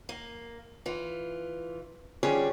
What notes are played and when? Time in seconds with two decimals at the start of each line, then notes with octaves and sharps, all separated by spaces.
0.09 A#3
0.86 E3 F4
2.23 D3 F3 G3 C#4 G#4 C#5